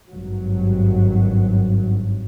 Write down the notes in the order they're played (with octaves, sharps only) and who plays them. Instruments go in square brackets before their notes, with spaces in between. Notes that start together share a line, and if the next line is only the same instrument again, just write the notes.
[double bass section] G#1 G2 F#3